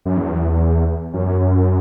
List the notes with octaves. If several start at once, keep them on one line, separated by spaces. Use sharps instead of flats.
F#2
E2
F#2